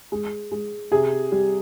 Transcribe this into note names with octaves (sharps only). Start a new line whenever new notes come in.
G#3
G#3
C3 G#4
G3